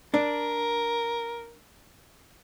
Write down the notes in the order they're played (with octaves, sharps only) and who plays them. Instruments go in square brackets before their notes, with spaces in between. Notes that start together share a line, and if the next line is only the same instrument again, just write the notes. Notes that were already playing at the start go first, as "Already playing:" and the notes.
[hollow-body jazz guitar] D4 [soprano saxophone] A#4